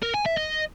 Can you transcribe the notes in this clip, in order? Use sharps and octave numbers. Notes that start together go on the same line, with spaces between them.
A#4
G#5
E5
D#5